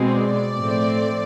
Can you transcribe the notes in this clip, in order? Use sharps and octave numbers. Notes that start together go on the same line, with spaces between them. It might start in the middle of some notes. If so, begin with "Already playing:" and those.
Already playing: B2 G#3 C4
D5
A2 F3 A3 C4